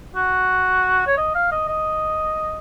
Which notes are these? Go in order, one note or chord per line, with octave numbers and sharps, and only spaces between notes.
F#4
C#5
D#5
F5
D#5
D#5